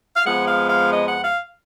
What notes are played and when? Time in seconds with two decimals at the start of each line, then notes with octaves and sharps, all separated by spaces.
0.16 F5
0.25 F2 F3 G#3 B3 F#5
0.47 F5
0.69 F5
0.91 D#5
1.08 F#5
1.23 F5